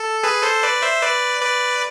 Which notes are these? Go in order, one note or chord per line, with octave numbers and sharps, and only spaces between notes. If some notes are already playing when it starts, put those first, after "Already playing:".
Already playing: A4
G#4 B4
A4 C5
B4 D5
C5 E5
B4 D5
B4 D5